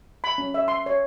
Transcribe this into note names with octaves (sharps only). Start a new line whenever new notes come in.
B5
C#4
E5
C6
C#5